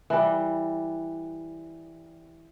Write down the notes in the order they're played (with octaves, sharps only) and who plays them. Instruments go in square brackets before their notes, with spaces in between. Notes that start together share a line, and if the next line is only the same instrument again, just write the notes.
[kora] E3 G3